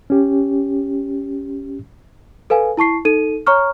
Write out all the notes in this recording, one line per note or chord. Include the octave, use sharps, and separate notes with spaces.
C#4 G4
A4 B4 F5 G#5
E4 A5 C#6 C7
D#4 A4 D#7
C#5 A#5 C#6 F6